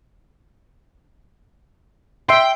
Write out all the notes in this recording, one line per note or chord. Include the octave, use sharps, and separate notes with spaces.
E5 G5 C6